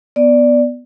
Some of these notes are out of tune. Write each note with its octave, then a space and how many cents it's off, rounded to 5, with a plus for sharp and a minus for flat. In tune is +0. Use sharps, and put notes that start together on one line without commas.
B3 +0 D5 +0